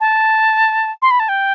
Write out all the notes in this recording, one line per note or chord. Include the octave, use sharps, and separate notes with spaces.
A5
C6
B5
A5
G5